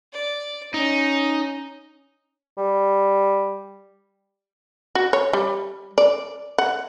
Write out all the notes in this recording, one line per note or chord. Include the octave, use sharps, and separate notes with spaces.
D5
C#4 D#4
G3
F#4
C#5
G3
D5
F#5